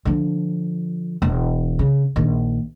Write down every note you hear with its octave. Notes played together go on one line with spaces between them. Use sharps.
D3 F3
E1
C#3
A#1 D#3